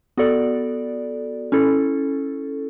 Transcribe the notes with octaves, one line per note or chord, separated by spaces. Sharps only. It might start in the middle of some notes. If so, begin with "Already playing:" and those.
B3 F#4 A4 D5
C#4 E4 A4